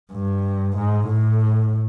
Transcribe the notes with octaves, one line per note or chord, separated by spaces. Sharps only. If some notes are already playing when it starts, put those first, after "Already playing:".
G2
G#2
A2